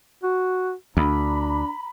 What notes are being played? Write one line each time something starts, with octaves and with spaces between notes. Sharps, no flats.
F#4
D2 D4 A#5 B5